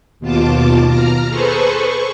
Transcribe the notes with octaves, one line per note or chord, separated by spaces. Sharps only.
D#2 B2 F4 A5 D6
A#5 F6
G#4 A4 B4 C5 C#6
C#6